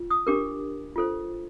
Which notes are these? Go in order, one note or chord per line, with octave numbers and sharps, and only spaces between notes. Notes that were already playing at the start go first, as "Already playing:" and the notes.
Already playing: F4
D#6
D4 G4 A#4 D6
F4 A4 C5